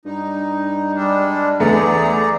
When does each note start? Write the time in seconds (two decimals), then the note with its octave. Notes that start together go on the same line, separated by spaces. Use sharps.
0.05 G2 D#4
0.95 G3 G#3 D4
1.60 E2 A3 B3 G#4 D5 A#5